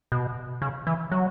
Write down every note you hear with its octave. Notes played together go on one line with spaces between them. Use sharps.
B2
C#3
E3
F#3